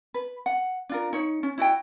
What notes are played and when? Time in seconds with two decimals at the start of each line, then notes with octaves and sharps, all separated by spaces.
0.14 B4
0.46 F#5
0.89 D4 F4 A#4
1.13 D#4 C#5
1.43 C#4
1.58 E4 F#4 D#5 G5